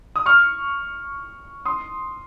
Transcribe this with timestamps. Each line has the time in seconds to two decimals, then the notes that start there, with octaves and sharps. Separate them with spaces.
0.16 D#6
0.26 C#6 F6
1.65 C6 D#6